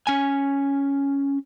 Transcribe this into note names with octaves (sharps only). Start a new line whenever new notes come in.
C#4 G#5